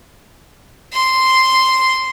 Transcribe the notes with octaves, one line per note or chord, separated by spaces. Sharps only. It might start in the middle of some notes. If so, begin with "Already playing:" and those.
C6